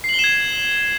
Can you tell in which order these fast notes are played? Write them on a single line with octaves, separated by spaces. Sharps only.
C7 F#7 G7 E7 G#6